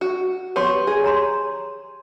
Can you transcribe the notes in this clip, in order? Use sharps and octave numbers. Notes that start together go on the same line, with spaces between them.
F#4
B3 G4 C#5 C6
G#4
C#5 A#5 C6